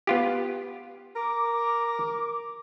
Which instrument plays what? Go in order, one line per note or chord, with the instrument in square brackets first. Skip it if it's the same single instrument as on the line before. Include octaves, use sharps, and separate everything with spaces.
[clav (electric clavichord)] B3 F4 G4
[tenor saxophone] A#4 [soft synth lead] D6